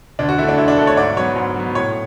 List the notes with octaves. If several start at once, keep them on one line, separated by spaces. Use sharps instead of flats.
D2 D4
F#4
D3 A3 E4
D4
D2 E4
D4
D3 A3 A4
C#5
G#2 D5
F#3 B3 C#5
G#2
F#3 B3
A2 C#5